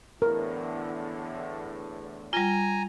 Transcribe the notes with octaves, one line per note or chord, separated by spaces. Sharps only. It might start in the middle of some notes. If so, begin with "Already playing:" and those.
E2 A2 D3 A#4
G3 F4 G#5 A#5